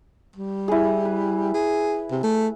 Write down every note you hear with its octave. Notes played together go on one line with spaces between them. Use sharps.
G3
E4 G#4
B4
G#4
C3
A3